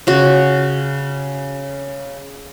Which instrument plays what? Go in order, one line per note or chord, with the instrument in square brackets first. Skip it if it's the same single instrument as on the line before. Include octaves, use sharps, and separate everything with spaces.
[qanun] C#3 F#4